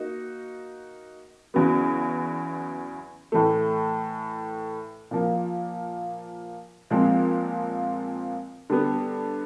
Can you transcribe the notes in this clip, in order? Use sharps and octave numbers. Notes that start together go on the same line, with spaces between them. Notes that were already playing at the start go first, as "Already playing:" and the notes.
Already playing: A#3 D#4 F#4
E2 C#3 F#3 B3
A2 E3 A3
A#2 F3 A#3
A#2 F3 G#3 C4
D3 G3 B3